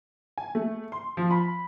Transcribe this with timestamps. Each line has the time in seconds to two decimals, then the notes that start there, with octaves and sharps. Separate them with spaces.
0.38 G#5
0.55 A3
0.92 C6
1.17 F3
1.31 B5